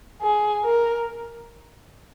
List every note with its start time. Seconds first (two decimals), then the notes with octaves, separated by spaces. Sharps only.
0.22 G#4
0.64 A#4